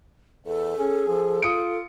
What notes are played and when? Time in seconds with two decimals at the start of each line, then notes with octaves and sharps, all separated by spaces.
0.46 E2 A4
0.78 C#4 G#4
1.08 F3
1.42 F4 D#6 C#7 D7